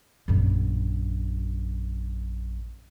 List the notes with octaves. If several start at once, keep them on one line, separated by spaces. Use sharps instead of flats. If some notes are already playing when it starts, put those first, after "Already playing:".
A#1 F#2